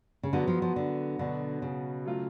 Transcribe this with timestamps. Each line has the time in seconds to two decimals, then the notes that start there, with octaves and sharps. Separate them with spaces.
0.23 C#3
0.33 D3 F#3 B3 F#4
0.47 F3
0.62 F3
0.76 D3
1.19 B2 D3 F#3 B3 F#4
1.62 C#3
2.05 F#3 A3 F4